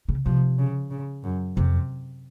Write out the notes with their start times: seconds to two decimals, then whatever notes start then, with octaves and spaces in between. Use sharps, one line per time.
0.09 C#3
0.25 C3 F3
0.59 C#3
0.90 C#3
1.24 F#2
1.56 F2 C3